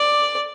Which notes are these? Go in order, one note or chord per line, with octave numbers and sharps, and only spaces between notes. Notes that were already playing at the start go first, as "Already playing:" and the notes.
Already playing: D5